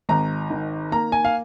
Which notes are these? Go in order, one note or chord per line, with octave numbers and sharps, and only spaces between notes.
G#1 A#5
D#3
A#3 A#5
G#5
F5